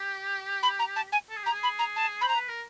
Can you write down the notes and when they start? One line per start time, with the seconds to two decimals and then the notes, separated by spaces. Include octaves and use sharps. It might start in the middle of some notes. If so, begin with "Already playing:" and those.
Already playing: G4
0.63 B5
0.79 A#5
0.96 A5
1.12 G#5
1.29 A4
1.37 G#4
1.43 G4
1.46 A#5
1.51 G#4
1.63 B5
1.79 A#5
1.96 A5
2.21 C5 B5
2.29 A#5
2.35 B4
2.48 A#4